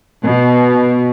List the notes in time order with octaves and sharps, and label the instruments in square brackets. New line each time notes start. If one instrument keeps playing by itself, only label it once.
[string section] B2